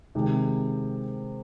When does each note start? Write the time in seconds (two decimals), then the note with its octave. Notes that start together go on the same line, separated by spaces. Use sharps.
0.15 C3 D#3 G#3